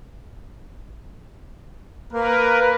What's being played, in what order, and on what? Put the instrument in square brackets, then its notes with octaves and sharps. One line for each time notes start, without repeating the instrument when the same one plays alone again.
[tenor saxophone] A#3 [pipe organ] A#4 B4